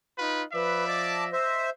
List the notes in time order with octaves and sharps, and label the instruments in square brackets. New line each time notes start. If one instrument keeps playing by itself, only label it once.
[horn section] D#4 F4 B4
[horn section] F3 D5 E5 [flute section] B4
[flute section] D#5 [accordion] A5 D6
[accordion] C5 E5